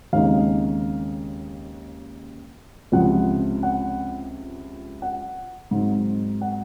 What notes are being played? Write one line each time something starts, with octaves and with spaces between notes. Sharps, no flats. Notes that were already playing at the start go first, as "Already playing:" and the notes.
D#2 C#3 G#3 C4 D#4 F5
C#2 C3 F3 F#5
F#5
F#5
G#2 F#3 C4 D#4
F#5